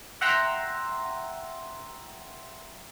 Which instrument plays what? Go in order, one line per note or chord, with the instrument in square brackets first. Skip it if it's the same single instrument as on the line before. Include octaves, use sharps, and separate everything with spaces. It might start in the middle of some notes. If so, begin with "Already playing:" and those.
[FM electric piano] E5 F#5 G5 A#5 C6 E6